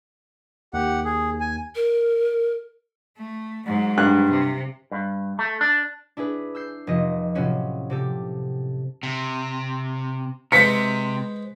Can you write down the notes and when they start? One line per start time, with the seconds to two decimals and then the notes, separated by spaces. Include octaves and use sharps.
0.74 D#2 G4 F#5
1.04 G#4
1.40 G#5
1.75 A#4
3.18 A3
3.66 G#2 F#3
3.97 G2 F#6
4.30 C3
4.91 G2
5.39 A3
5.61 D4
6.17 D4 E4 G#4 B4
6.55 E6 G6 C7
6.87 F1 F3 D#5
7.35 A2 C3 F3 F#3 C#4 F#4
7.90 C3 G4 A4
9.03 C3
10.52 C3 G#3 B4 C5 B6 C#7